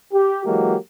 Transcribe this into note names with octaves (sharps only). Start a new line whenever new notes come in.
G4
E3 F#3 G#3 A#3 F#4 G4